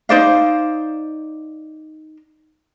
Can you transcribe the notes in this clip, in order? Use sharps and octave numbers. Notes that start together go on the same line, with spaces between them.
D#4 C5 D5 F5